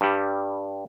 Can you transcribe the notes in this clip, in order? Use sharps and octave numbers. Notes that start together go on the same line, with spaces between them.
G2 G3